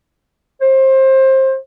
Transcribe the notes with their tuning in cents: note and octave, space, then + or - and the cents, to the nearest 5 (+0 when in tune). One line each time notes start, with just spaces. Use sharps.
C5 +25